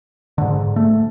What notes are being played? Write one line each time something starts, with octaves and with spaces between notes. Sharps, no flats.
G#2 D3
A3